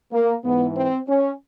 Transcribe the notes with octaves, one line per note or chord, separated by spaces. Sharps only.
A#3
G#2 E3 B3
C4
C#4